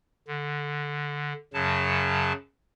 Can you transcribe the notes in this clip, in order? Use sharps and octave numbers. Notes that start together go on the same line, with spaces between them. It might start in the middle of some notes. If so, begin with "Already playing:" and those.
D3
F#2 C#3 F#3 A5